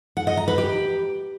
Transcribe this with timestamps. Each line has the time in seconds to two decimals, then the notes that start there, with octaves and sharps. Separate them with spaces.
0.17 F#5
0.27 D#5
0.37 A#5
0.48 B4
0.58 G4